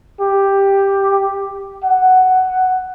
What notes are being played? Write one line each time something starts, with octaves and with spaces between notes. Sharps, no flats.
G4
F#5